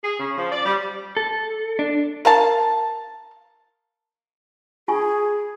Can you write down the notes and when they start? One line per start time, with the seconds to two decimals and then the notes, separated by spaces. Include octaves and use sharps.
0.04 G#4
0.19 C#3
0.38 F3
0.52 D5
0.66 G3
1.17 A4
1.79 D4
2.25 A#4 F5 A5
4.88 F4 G#4 G#5 C#6